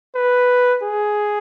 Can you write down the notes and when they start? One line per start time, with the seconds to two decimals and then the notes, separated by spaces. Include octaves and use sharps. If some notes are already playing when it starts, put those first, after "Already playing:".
0.15 B4
0.83 G#4